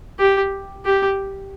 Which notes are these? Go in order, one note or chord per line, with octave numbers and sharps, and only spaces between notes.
G4
G4